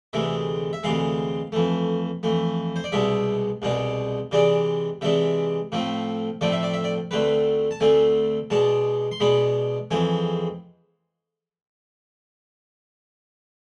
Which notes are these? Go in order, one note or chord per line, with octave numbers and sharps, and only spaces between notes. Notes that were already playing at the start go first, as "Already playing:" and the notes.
D2 C3 E3 G#3 E5
E5
D2 C3 E3 G#3 F5
F2 E3 A3
F2 E3 A3
C5
D5
C2 B2 G#3 D4 E5
C2 B2 G#3 D4
C3 E3 G#3 D4 D5
C3 E3 G#3 D4 E5
A2 F3 A3 C4
A2 F3 A3 C4 D5
E5
D5
E5
D5
D2 D3 A3 C4 B4
A5
D2 D3 A3 C4 G#5
B2 G#3 D4 A5
C6
B2 G#3 D4 B5
F2 E3 G#3 C4 G#5